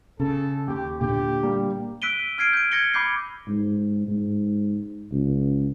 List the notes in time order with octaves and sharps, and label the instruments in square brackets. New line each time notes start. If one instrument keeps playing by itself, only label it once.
[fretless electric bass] C#3 [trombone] A4
[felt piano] D#2 [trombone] G4
[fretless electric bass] A#2 D3 [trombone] G4
[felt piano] G3 A#3
[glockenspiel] E6 F#6 B6 D7 D#7 G7
F6 G#6 C7 D7 D#7
G6 D7
G6 G#6 A#6 C#7 G7
B5 D6 G6 C7
[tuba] G#2
G#2
C#2